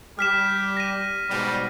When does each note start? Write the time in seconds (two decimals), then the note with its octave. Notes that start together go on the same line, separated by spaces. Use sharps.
0.19 G3 G4 F6 B6 E7
0.77 A#6 D#7
1.30 G#2 B2 G3